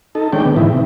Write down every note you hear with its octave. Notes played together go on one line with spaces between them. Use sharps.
D#4 A4
D#3 G#3 C#4 D4 G5
D3 B3
G#2 E3 D#4 E4
C3